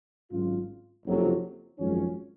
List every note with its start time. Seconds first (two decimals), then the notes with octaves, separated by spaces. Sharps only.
0.31 G#1 G#2 F#3 C#4 F4
1.06 F#1 F2 C3 F#3
1.79 G#1 F#2 F3 G#3 C#4